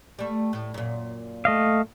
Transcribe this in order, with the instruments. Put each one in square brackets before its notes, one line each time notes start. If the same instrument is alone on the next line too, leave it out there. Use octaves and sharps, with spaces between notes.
[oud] G3 A3
A2
F#2 A#2
[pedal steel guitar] A3 D#5 F5